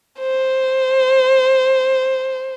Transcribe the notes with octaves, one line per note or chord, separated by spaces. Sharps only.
C5